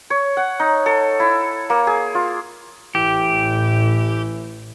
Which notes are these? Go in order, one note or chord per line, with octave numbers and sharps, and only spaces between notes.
C#5
F#5
D#4
A4
E4
A#3
G#4
F4
A1 A2 E3 G4